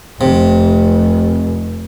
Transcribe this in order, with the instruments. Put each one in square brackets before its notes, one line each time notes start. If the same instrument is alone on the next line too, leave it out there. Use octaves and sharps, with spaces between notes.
[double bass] F1 [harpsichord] C3